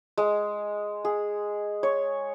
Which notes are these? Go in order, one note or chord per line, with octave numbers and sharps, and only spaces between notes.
G#3
G#4
C#5